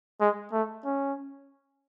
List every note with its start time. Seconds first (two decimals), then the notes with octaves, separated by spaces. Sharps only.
0.20 G#3
0.52 A3
0.85 C#4